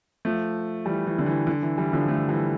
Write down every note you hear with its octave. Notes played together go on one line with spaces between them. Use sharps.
F3 A3
E3 G3
E3
D3
E3
D3
E3
E3 G3
D3 F3
F3 A3
E3 G3